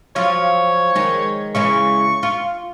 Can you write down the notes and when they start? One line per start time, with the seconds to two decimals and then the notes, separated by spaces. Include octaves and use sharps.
0.16 F3 F#3 F4 C#5
0.95 D#3 G#3
1.55 C#3 E3 G#3 C#6
2.23 F4